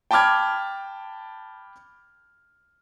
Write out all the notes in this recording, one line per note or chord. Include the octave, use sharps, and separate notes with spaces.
G5 A5 B5 D6 F6 G#6